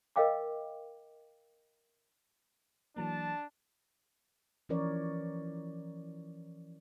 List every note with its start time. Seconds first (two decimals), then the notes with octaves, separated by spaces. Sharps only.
0.16 A#4 D#5 F5 G5 D6
2.97 E3 F#3 A#3 D4 A5
4.69 E3 F3 C#4 A#4 C#5 D5